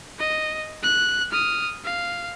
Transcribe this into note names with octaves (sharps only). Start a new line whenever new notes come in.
D#5
F#6
D#6 F6
F5